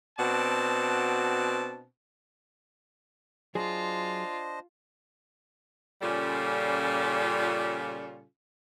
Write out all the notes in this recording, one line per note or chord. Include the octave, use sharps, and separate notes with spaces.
B2 C4 D4 F#4 A5
F#3 D4 F4 G#4 C5 D#5
A#2 C#3 G3 C#4 F4 A4